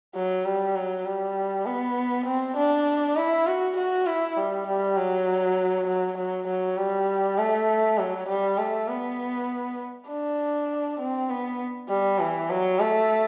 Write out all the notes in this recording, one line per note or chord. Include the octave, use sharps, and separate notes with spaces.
F#3
G3
F#3
G3
B3
C4
D4
E4
F#4
F#4
E4
G3
G3
F#3
F#3
F#3
F#3
G3
A3
F#3
G3
A3
B3
D4
C4
B3
G3
E3
F#3
A3